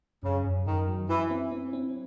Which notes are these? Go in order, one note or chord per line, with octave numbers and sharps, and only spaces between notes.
F#2 C#3
F#2
F#2 D#3
F#3
E3 E4
C4
C4
C4